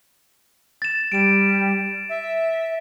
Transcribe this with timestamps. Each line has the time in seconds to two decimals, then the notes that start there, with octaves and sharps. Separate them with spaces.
0.82 A6 E7
1.12 G3 D7 E7
2.10 E5